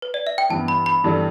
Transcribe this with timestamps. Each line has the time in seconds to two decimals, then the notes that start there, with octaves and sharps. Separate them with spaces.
0.02 B4
0.14 D5
0.27 E5
0.38 G5
0.49 G2 E3 B3 A5
0.68 B5
0.86 B5
1.04 G2 E3 G3 D4 A4